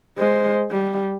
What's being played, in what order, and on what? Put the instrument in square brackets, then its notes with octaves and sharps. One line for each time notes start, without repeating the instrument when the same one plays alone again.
[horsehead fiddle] G#3 C5
G3